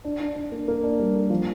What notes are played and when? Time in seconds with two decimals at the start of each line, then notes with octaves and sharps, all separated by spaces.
0.05 D4
0.20 D4
0.36 D4
0.52 A#3
0.68 A#3
0.84 D4
0.99 G3
1.15 A#3
1.30 F3